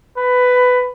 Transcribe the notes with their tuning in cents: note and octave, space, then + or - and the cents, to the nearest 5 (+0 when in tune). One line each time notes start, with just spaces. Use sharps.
B4 +15